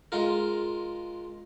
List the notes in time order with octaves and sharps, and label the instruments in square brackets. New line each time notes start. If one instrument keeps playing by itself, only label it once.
[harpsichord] G#3 F4 A#4